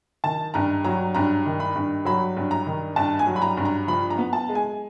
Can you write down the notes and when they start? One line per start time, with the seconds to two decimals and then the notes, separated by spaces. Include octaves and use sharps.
0.24 D#3 A5
0.54 G2 A#5
0.84 F#3 A#5
1.14 G2 A#5
1.46 D#3
1.60 B5
1.75 G2
2.05 F#3 B5
2.36 G2
2.51 A#5
2.66 D#3
2.96 G2 A5
3.19 G#5
3.27 F#3
3.36 B5
3.42 A#5
3.57 G2
3.65 A#5
3.88 F3 B5
4.10 A#5
4.18 B3
4.33 A5
4.49 G#3
4.55 G#5